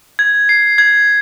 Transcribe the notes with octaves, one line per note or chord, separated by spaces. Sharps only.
G#6
C7
G#6